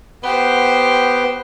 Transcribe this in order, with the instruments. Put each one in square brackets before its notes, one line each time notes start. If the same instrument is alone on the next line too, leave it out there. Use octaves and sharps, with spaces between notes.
[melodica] B3 B4 [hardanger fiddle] G4 C5